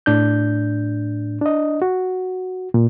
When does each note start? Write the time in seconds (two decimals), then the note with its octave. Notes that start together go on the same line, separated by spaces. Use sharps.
0.06 A2 D4 G6
1.41 D4 D#5
1.82 F#4
2.74 A#2